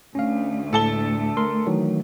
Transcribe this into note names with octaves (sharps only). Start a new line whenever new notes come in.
D2 A3 C#4 F5
A2 A4 A5 G7
A#4 C6
D#3 E3 F#3